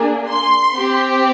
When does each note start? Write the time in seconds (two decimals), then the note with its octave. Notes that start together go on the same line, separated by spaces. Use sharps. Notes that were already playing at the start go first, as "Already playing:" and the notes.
Already playing: A#3 D4 G#4
0.29 C6
0.78 C4 G4